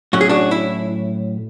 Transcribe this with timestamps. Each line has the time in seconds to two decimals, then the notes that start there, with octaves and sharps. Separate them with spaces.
0.13 A2 F#3 C#4 F#4
0.21 G#4
0.29 D4 F#4
0.51 E4